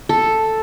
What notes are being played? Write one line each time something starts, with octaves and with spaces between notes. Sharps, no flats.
A4